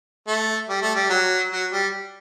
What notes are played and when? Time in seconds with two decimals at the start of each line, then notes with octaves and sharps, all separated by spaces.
0.27 A3
0.69 G3
0.82 A3
0.95 G3
1.10 F#3
1.52 F#3
1.72 G3